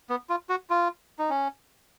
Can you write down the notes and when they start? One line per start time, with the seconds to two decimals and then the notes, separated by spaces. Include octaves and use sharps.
0.10 B3
0.30 F4
0.49 F#4
0.70 F4
1.19 D#4
1.30 C#4